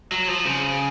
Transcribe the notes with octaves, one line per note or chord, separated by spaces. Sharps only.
F#3
F3
C#3